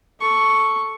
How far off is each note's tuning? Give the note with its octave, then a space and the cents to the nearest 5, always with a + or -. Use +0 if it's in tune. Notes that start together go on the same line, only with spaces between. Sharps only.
A4 +0 C#6 +0